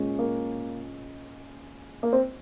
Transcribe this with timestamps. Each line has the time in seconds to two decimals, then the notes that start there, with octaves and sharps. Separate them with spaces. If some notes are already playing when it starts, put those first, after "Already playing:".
Already playing: A#2 G#3 C#4 G#4
0.19 A#3
2.03 A#3
2.13 C4